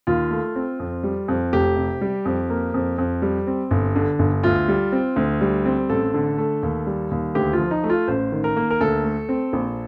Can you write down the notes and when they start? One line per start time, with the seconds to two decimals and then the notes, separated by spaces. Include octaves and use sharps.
0.07 D#2 F4
0.31 A3
0.56 C4
0.80 F2
1.04 G3
1.28 F2
1.53 F1 G4
1.76 C3
2.01 G3
2.25 F2
2.50 A#3
2.74 F2
2.98 F2
3.22 G3
3.47 C4
3.71 G1
3.96 D3
4.19 G1
4.44 D2 F4
4.68 G3
4.92 C4
5.16 D2
5.41 G3
5.66 C4
5.89 A1 A4
6.14 D3
6.38 A3
6.63 D#2
6.87 G3
7.11 D#2
7.35 D2 G4
7.53 F4
7.59 F3
7.71 D#4
7.84 A3
7.90 F4
8.08 A1 C5
8.32 D#3
8.44 A#4
8.57 A#3
8.71 A#4
8.81 D2 A4
9.04 A3
9.29 C4
9.53 A#1